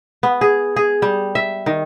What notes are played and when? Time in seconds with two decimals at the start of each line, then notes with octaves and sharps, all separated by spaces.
0.23 B3
0.41 G#4
0.76 G#4
1.02 G3
1.35 E5
1.66 D#3